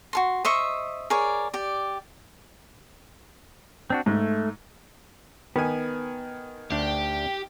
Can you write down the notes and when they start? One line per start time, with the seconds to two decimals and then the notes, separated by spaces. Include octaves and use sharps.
0.13 F#4 A4 C6
0.45 C5 D#5 E5 C#6
1.10 G#4 A#4 C#5 D5
1.53 G4 D5
3.90 C4 D4 F#4
4.06 G#2 A3
5.56 D#3 B3 G#5
6.71 D2 D4 G4